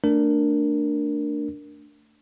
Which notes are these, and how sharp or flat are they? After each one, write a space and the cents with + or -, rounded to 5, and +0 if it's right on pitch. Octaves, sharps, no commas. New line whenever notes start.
A3 +20 D4 +0 A#4 +0